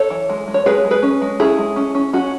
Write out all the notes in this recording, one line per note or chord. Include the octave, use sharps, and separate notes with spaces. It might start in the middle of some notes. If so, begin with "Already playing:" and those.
Already playing: A4 C#5
E3
G#3
G#3
C#5
G#3 G#4 B4
G#3
G#4 B4
C#4
G#3
C#4 E4 G#4
G#3
C#4
C#4
C#4 F#4